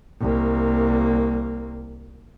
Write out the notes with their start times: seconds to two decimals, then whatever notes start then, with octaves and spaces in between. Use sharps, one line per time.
0.21 C2 A#3